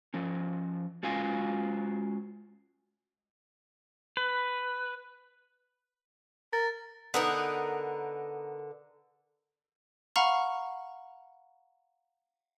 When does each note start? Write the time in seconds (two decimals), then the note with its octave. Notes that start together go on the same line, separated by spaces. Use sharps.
0.14 F3 C#4
1.03 G#3 C#4 F4 F#4 F5 G#5
4.17 B4
6.53 A#4 A6
7.14 D3 B3 D#4 A#4 B4
10.16 F5 F#5 A#5 B5 C#6 F6